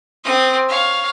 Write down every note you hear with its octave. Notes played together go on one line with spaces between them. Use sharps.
C4 D#6
C#5 F5